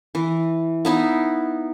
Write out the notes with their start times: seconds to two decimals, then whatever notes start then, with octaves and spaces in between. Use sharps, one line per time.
0.15 E3
0.85 B3 D#4 E4